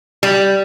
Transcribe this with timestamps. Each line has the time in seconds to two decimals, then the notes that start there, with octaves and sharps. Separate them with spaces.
0.23 G3